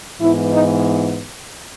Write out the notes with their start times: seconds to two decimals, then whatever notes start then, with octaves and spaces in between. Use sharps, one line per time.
0.20 G#2 E3 B3 E4
0.53 D#4